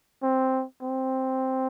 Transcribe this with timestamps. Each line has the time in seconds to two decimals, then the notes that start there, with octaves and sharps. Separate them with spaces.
0.23 C4
0.82 C4